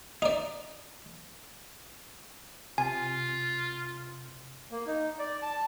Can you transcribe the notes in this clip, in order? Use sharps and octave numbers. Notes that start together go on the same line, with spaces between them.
D#4 D5
C3 F4 G#5
A#3
D#4
D5
A5